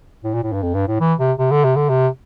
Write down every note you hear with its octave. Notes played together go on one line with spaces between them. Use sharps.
A2
A#2
A2
G2
F2
G2
A2
E3
C3
C3
D3
C3
D3
C3